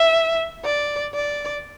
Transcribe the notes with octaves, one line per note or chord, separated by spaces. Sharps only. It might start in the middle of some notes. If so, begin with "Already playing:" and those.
Already playing: E5
D5
D5